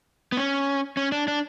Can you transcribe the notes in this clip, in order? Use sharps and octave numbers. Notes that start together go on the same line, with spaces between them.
B3
C#4
C#4
D4
D4